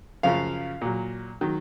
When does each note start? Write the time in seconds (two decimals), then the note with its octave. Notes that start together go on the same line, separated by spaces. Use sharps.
0.23 F#2 C#3 F3 F5
0.81 A#2 F#3
1.41 D#3 F#3